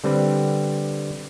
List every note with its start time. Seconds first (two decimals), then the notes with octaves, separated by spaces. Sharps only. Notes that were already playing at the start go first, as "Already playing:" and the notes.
0.04 D3 G3 C4 B4